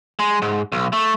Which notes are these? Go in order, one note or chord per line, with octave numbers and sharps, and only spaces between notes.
G#3
G#2
B1
A3